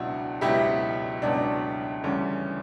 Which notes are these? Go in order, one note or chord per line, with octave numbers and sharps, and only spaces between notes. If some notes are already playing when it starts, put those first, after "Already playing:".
Already playing: C#2 B2 F#3 D4 E4 F#4
C#2 B2 F#3 E4 G4
C#2 B2 F#3 D4
D2 C#3 E3 G3 C#4